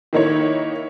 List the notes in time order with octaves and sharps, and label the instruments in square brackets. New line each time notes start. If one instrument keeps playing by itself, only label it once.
[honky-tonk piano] D#3 A#3 D#4 E4 C#5